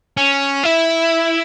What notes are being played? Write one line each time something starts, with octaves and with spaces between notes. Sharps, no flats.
C#4
E4